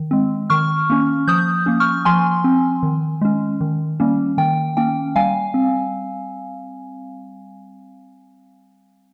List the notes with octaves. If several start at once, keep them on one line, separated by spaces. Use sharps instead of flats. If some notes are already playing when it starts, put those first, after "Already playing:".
Already playing: D#3
G#3 C4
D#3 C#6 F6
A#3 C#4
F3 D#6 G6
A#3 C#4
C#6 F6
F3 G#5 C6
C4
D#3
G#3 C#4
D#3
G3 A#3 C#4
D#3 G5
A#3 C#4 G5
G3 F5 G#5
C4